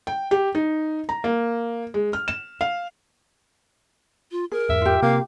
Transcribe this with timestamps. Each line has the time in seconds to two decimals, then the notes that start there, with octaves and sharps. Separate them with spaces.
0.07 G5
0.31 G4
0.55 D#4
1.09 A#5
1.24 A#3
1.94 G#3
2.13 F6
2.28 E7
2.61 F5
4.32 F4
4.52 G#4 A#4
4.69 E2 G#2 E5
4.81 F4 G4
5.02 C3 A#3 C4 F5